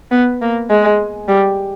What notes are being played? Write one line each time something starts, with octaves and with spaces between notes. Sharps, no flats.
B3
A#3
G#3
G3